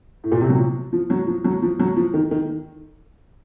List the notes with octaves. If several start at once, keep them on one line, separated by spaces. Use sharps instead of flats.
A2
A#2
C3
F#3
F3
F3
F#3
F3
F#3
F3
F#3
F3
D#3
D#3